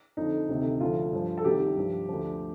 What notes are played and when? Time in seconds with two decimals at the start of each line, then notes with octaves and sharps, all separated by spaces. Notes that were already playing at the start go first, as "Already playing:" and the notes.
0.17 F2 D3 F3 D#4
0.48 D2 C3 D#3
0.80 D2 D3 F3 F4
1.12 G2 F3
1.38 A4
1.45 C2 C3 D#3 G4
1.77 G2 F3
2.09 D2 D3 F3